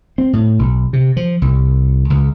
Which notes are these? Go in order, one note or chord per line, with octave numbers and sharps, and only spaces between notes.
C4
A2
B1
C3
F3
C2
C#2